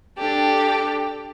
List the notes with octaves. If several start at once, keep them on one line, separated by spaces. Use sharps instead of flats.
D4 G4 A4